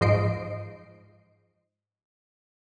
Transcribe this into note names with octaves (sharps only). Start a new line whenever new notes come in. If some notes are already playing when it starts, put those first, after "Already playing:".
G#2 F3 C5 D#5 C7 D7